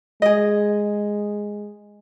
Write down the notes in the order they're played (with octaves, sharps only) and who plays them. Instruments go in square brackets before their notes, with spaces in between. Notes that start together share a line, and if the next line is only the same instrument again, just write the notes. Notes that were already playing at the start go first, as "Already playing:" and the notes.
[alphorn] G#3 [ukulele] G#4 D#5